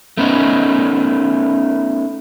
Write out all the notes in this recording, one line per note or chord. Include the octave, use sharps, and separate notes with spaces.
A3 B3 C#4 D#4